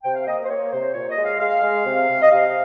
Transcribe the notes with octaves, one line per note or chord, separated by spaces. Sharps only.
C3 G5
F5
A#3 D#5
C5
A#3 C#5
C3 C5
A#2 C#5
D#5
G#3
F5
G#3 F5
G#3
C3
C3
D#5
C3 F5